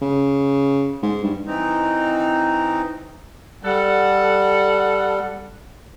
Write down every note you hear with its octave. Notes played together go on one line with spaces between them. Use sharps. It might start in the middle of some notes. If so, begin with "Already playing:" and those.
C#3
G#2
G2
E3 C4 D#4
G3 A4 F#5